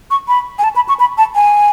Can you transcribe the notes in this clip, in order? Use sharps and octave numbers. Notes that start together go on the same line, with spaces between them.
C#6
B5
G#5
A5
B5
C#6
B5
A5
G#5